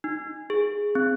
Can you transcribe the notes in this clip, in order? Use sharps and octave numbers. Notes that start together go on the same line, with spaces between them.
D#4
G#4
C4